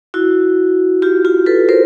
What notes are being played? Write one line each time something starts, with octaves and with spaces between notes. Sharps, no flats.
E4 F#4
F4 G4
F4 G4
A4 B4
A#4 C5